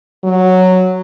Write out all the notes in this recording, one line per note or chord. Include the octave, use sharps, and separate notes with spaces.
F#3